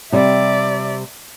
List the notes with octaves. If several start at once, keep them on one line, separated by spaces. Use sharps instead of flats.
C3 G3 D5 E5